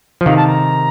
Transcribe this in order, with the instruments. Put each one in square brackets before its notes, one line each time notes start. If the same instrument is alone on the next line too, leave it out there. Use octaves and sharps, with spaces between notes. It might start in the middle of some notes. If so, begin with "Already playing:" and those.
[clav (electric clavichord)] F3
[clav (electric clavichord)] C3 D#3 [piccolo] F5
[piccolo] A5
A#5